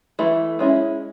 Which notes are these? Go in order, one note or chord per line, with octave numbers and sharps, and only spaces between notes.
E3 A3 E4
G#3 C#4 E4